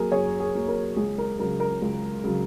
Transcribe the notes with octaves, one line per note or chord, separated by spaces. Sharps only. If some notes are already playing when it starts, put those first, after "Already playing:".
Already playing: F#2 F#3 A#3 G#4 A#4
F#2 G#4 C#5
G#4
F#3 A#3
A#4
C#2 G#4
A#4
C#3 F#3 A#4
A#4
C#2
C#3 F#3